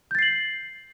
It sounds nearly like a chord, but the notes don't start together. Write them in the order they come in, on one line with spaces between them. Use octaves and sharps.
G6 A6 C7 F#7